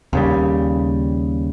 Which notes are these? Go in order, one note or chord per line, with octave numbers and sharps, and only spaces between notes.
D#2 C#3 G3